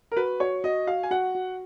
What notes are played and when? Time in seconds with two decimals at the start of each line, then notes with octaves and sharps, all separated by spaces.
0.12 A#4
0.17 F#4 B4
0.40 F#4 C#5
0.64 F#4 D#5
0.87 F#4 F5
1.03 G#5
1.11 F#4 F#5
1.35 F#4